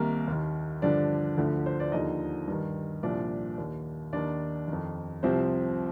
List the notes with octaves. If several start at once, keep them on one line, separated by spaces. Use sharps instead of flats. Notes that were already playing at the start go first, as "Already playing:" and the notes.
Already playing: C2 C3 D#3 A#3 A#4
D#2 D#3
G2 D3 F3 D4 D5
D2 D3 F3
C5
D5
D#2 D3 F3 D#4 D#5
G2 D#3
C2 A#2 F3 D4 D5
D#2 D#3
D#2 D#3 D4 D5
F2 D#3
C2 C3 F3 C4 C5